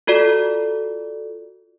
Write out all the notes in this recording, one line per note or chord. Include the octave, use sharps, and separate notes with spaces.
F4 F#4 A4 D5